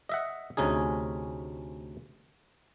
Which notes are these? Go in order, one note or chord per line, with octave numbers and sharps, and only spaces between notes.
D#5 E5 F#5
D2 C3 C#4 D#4 G#4